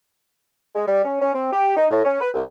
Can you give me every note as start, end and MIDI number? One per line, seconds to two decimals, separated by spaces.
0.75 0.87 56
0.87 1.02 55
1.05 1.20 61
1.22 1.32 61
1.34 1.51 60
1.53 1.75 67
1.77 1.86 63
1.91 2.02 45
2.05 2.19 61
2.21 2.29 71
2.34 2.42 36